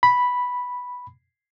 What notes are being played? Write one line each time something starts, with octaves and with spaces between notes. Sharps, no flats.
B5